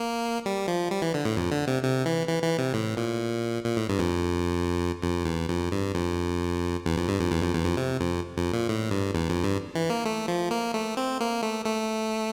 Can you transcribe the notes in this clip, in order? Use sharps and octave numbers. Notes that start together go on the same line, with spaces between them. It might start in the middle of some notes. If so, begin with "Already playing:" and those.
Already playing: A#3
G3
F3
G3
E3
D3
A2
F2
D3
C3
C3
E3
E3
E3
C3
A2
A#2
A#2
A2
G2
F2
F2
E2
F2
G2
F2
E2
F2
G2
F2
E2
F2
E2
F2
C3
F2
F2
A#2
A2
G2
E2
F2
G2
E3
A#3
A3
F3
A#3
A3
C4
A#3
A3
A3